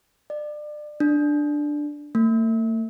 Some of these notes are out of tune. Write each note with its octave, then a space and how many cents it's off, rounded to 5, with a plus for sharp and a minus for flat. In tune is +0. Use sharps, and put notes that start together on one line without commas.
D5 +30
D4 +5
A3 +45